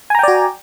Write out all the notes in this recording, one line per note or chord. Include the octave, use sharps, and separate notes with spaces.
F#4 D5 G5 G#5 A#5